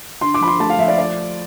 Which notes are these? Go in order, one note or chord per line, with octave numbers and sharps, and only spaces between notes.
D3 C6
D6
F3 B5
C6
A3 A5
F5
F3 E5
D5
D5